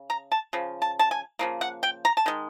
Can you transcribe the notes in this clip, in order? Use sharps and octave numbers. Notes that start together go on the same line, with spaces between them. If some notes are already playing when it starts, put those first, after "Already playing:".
Already playing: C#3
A#5
A5
C#3 F3
A5
A5
G#5
C#3 F3 A#3
F#5
G5
A#5
A5
D#3 G#3